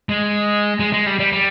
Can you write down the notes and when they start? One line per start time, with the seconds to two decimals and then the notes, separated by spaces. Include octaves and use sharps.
0.09 G#3
0.80 G#3
0.93 G#3
1.06 G3
1.19 G3
1.33 G3